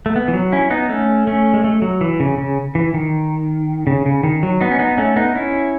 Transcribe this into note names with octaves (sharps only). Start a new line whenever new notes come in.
A3
B3
E3
F#3
C#4 E4
B3 D#4
A3 C#4
A3 C#4
G#3
A3
F#3
E3
C#3
C#3
E3
D#3
C#3
C#3
D#3
F#3
B3 D#4
C#4
B3 D#4
A3 C#4
B3 D#4
C#4 E4